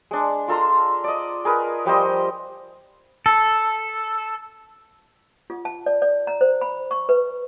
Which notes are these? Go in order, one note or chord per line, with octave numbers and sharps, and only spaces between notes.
G#3 D4
F4 A4 A#5 C6
D5 D#5
G#4 A#4 B4
F3 G3 C5 D#5
A4
F4
A5
D5
D5
A#5
C5
B5
C#6
B4